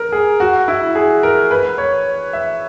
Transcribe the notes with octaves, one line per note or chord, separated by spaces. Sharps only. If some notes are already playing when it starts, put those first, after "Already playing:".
Already playing: A#4
G#4
F#4
E4
G#4
A#4
B4
C#5
E5